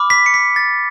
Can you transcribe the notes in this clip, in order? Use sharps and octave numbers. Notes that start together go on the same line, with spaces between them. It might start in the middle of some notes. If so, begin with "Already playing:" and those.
Already playing: B5 D6 F6
B6
C#7
B6
A6